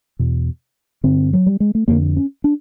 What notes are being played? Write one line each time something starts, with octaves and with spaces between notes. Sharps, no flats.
E2 B2
G2 D3 C4
F#3
G3
G#3
A3
F2 D3 A#3
C#4
D4